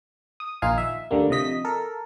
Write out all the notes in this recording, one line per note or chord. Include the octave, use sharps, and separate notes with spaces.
D#6
A#1 D#3 D#4 F4 F5 G#5
E5
D2 D3 G3 A#3
C3 F3 D#5 B6
A4 A#4